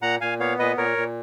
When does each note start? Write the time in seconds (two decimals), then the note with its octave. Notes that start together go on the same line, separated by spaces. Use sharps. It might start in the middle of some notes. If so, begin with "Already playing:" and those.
0.02 A#2 F#5 A#5
0.21 A#2 F5 G#5
0.40 B3 C#5 F5
0.59 A#2 B4 D#5
0.78 A#2 A#4 C#5
0.97 A#2